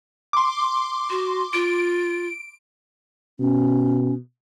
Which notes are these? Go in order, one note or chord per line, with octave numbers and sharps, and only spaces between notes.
C6 D6
F#4
F4 D7
B2 C#4